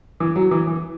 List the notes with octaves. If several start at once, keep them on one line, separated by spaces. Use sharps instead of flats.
E3
F#3
E3
E3